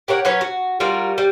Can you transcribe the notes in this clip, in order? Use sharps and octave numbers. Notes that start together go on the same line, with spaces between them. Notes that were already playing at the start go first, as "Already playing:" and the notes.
G4 A#4 C#5 F#5
F#3 C#4 B4 C#5
F#4
G3 F4 F#4 A#4
G3